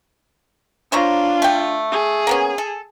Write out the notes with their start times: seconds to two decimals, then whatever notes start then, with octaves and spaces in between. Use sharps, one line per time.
0.92 D4 F4 C5 C#5 A#5
1.42 A3 G5
1.91 G#4
2.27 A#3 B3 C#4
2.58 A4